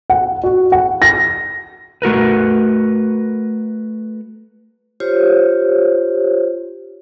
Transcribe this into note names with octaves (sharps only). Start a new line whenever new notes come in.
F#5
F#4
F#5
A#6
A3 F#4 A#4 B4
F4 G4 C5 C#5